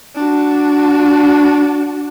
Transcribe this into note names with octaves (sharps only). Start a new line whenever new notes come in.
D4 F#4